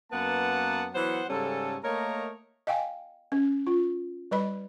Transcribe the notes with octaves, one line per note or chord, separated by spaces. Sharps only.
F#2 A#3 B3 B4 F#5 A5
E3 F#3 B3 C5 F#5
G#2 C#3 G3 C#4 A4
A3 A#3 A#4 C#5 D#5 A#5
D#5 F5 G5 G#5
C#4
F4
G3 B4 D#5 B5